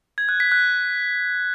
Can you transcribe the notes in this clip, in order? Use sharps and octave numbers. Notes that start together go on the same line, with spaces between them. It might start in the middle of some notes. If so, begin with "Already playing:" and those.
G#6
F#6
B6
F#6